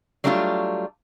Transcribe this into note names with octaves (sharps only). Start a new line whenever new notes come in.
F#3 G3 A3 D4 E4 F4